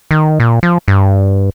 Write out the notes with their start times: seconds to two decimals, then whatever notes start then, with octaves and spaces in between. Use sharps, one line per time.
0.11 D#3
0.40 A#2
0.63 F3
0.88 G2